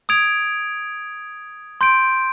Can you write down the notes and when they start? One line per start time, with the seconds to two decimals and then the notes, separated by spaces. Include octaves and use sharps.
0.09 D#6 G#6 D7 F7
1.81 C6 G6 D7